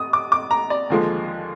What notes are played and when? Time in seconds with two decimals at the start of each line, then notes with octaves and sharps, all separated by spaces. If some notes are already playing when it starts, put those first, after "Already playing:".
Already playing: D#6
0.13 D6
0.32 D6
0.51 A#5
0.70 D5
0.90 D#2 D3 F3 G#3